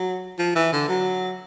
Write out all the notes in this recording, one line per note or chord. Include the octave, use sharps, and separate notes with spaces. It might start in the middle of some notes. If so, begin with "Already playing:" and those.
Already playing: F#3
F3
E3
D3
F#3